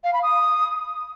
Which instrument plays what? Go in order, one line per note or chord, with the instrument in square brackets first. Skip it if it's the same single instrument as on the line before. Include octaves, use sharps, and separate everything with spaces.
[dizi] F5
B5
D#6